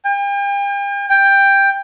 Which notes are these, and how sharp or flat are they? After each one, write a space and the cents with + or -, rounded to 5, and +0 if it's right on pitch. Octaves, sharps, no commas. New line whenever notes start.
G5 +40
G5 +10